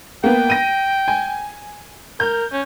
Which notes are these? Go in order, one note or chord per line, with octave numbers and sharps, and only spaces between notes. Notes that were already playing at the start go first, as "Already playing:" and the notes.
A#3 B3 G5
A#6 D#7
G#5
A#4 G6
C#4